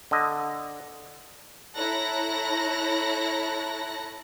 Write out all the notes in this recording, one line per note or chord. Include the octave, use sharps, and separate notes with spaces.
D3 D#5
E4 A4 C#5 A#5 F#6 A#6